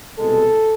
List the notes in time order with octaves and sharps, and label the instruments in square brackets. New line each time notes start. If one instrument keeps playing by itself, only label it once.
[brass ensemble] C2 B2 G#3 A4